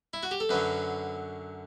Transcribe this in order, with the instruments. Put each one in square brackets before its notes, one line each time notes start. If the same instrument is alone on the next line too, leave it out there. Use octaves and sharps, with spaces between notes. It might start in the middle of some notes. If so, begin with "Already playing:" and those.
[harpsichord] E4
F#4
G4
A4
F#2 D3 F#3 B4